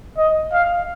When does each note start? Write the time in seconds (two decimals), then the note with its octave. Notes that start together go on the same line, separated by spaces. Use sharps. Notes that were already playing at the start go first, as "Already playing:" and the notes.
0.17 D#5
0.53 F5